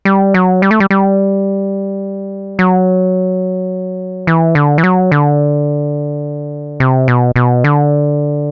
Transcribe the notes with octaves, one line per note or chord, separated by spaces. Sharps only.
G3
F#3
G3
A3
G3
G3
F#3
E3
D3
E3
F#3
D3
C3
B2
B2
D3